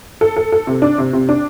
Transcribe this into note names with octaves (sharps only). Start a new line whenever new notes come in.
A4
A4
A4
C3
D4
C3
C3
D4